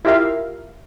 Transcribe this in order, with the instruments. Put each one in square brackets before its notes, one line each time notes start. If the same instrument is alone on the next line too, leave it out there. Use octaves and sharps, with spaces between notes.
[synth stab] E4 F4 G4 A#4 E5 F5